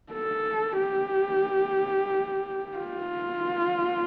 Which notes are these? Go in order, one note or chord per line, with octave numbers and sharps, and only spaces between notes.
A4
G4
F4